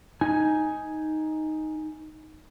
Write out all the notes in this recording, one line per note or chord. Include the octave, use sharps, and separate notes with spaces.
D#4 G#5